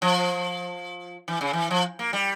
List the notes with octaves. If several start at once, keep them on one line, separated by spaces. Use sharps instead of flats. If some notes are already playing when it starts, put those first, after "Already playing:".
F3
E3
C#3
E3
F3
A#3
G3